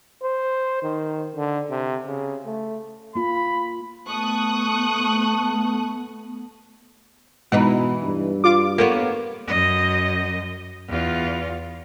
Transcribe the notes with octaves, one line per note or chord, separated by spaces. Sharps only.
C5
D#3
D3
C3
C#3
A3
A#3 F4 B5
A3 B3 A5 C#6 D#6 F#6
B2 E3 G#3 D#4 B4
G2
F4 D6
A#3 B3 A4 A#4 C#5
F#2 D#5
E2 F4